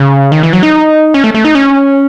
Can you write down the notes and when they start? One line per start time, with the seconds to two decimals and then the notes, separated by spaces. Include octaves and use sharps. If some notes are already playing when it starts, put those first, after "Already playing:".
Already playing: C#3
0.32 D#3
0.43 E3
0.53 F#3
0.63 D#4
1.14 C#4
1.24 A3
1.34 A3
1.45 D#4
1.55 C#4